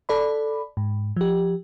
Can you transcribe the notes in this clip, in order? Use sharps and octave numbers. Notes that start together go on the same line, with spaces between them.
A4 D5 B5
G#2
F3 G4